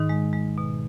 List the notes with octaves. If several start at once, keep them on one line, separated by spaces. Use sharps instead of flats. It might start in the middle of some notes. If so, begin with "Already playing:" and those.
Already playing: G#2 D#3 D#4
G#3
G#3
B2